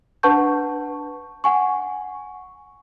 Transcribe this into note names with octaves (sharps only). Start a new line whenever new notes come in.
D4 B4 F#5 A5 C#6 G6
F#5 G#5 C#6